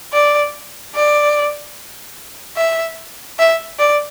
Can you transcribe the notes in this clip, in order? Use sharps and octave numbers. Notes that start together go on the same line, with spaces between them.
D5
D5
E5
E5
D5